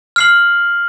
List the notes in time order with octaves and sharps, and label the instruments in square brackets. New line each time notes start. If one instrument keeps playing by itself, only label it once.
[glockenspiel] F6 C7 F#7